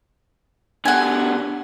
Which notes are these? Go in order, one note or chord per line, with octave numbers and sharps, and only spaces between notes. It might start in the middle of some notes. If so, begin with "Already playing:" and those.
B2 D3 F#5 G#5